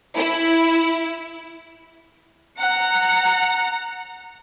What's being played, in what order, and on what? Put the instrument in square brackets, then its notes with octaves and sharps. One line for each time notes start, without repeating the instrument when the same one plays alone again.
[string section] E4
[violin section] F#5 A#5